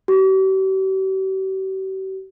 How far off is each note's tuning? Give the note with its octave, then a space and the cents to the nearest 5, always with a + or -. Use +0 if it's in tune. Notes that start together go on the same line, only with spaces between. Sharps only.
G4 -45